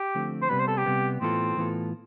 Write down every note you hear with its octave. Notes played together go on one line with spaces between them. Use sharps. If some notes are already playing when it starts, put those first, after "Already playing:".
Already playing: G4
D3 F3 A3 C4
C5
C3 G3 B3 B4
C5
A4
G4
C3 G3 B3
A2 E3 B3 C4 F4 A4
A2 E3 B3 F4 A4